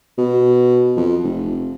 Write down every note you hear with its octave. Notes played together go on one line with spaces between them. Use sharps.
B2
F2
F1